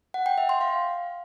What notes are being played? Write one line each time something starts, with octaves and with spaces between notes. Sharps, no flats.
F#5
G5
E5
C6
F5